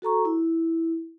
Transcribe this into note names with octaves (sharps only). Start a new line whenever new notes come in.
F#4 A4 A#5 C#6
E4